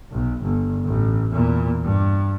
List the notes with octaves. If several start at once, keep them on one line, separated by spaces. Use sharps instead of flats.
B1
G1
A1
E2 A#2
G2